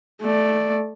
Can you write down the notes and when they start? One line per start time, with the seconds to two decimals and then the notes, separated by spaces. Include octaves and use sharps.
0.21 A3 D5